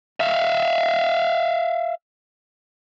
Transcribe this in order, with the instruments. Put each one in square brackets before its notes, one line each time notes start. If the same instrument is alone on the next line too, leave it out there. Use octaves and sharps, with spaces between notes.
[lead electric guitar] E5 F5